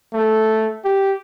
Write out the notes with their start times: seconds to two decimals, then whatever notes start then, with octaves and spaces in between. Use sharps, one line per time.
0.14 A3
0.84 G4